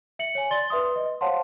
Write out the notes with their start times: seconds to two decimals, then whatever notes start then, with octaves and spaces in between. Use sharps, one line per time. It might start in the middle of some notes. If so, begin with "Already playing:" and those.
0.19 E5 C#7 F#7
0.35 C#5 G#5
0.51 D5 C6 A6 G7
0.70 B4 E5 C6 D#6
0.96 D#5
1.21 C5 C#5 F5 F#5 A5 C6